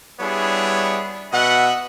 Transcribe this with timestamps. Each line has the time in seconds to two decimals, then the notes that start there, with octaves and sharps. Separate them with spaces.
0.20 G3 B3 D4 E4 G#4 C#5
1.32 B2 D#5 E5 F#5